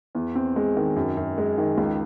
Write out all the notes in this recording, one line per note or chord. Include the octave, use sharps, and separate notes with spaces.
E2
C4
G#3
D#3
F#2
F#2
G#3
D#3
C#2